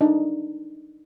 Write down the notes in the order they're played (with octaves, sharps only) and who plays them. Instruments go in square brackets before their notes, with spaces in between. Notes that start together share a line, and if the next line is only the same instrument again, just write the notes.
[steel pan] D4 D#4